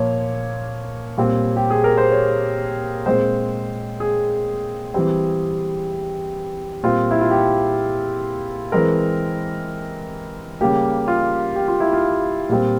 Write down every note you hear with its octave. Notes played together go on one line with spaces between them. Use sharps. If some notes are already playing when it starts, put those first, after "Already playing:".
Already playing: A#2 F3 A#3 C#5
A#2 G3 C4
G4
G#4
A#4
C5
C#5
A#2 G#3 C4 C5
G#4
E3 G3 C4
A#2 G3 C4 F4
E4
F4
G4
E3 G#3 C4 A#4
C#3 G3 A#3 G4
F4
G4
F4
E4
F4
A#2 G3 C4